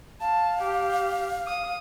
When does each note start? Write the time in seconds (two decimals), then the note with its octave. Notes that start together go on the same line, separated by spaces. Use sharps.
0.21 F5 A5
0.62 G4
1.47 D#6